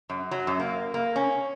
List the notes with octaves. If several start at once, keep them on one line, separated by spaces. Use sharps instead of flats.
F#2
F#3
F#2
A#3
A#3
C#4